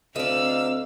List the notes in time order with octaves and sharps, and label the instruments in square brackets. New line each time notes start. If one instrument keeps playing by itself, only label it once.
[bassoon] D2 [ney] C4 [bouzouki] D#4 D5 [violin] F5 E6